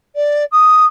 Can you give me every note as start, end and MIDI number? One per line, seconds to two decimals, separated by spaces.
0.15 0.44 74
0.51 0.86 87